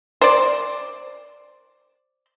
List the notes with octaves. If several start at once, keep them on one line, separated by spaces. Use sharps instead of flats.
C5 D5